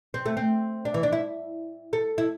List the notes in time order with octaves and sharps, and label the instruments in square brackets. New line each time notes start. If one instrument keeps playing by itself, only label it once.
[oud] C4
A3
C4
D4
E3
D4
E4
A4
E4